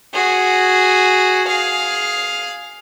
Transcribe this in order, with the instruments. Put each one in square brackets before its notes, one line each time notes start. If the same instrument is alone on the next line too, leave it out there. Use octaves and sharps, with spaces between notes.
[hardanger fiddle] F#4 G#4
G#4 F5